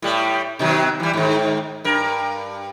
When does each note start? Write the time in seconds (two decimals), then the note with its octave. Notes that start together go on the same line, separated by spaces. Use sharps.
0.02 A2 G3
0.59 B2 D#3 F#3
1.00 E3 G3
1.13 G#2 D#3
1.84 G2 A#4